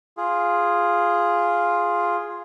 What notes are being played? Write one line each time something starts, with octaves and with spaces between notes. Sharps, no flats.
F4 G#4